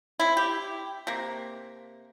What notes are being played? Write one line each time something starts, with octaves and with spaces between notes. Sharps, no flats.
C4 E4
G4
C3 A#3